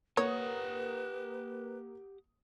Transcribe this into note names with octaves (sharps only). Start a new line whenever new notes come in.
A#3 G4 B4 C#5 F#5 D#6